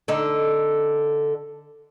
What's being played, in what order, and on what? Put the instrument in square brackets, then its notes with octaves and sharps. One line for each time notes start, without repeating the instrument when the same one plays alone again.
[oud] D3 D#4